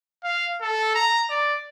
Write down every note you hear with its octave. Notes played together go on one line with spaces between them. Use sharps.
F5
A4
A#5
D5